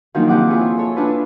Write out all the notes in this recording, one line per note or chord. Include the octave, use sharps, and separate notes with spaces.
D#3 F3 F#3 A#3 D4 D#4
C3 F3 F#5 D6
E4 F4 G#4 C#5
F2
A4 C#5
D4 E4 F4 B4